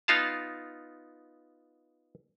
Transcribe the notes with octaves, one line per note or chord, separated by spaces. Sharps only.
B3 D#4 F4 F5 A5